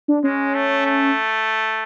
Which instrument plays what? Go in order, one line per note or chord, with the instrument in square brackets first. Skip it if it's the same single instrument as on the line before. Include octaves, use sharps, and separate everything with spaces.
[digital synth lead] D4
[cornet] G#3 [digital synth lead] C#4
[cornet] A3
A3